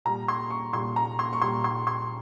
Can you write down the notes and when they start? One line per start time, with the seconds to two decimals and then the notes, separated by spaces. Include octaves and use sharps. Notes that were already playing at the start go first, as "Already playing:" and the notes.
0.05 A#2 G3 A#5
0.28 C6
0.50 C#6
0.73 A#2 G3 C6
0.96 A#5
1.19 C6
1.33 C#6
1.42 A#2 G3 C6
1.64 C6
1.87 C6